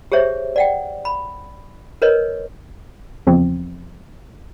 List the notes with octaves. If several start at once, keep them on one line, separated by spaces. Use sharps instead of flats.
G4 G#4 C5 C#5 E5
D5 F#5 G5
B5
A#4 B4 C#5 D#5
E2 C#3 F3 C4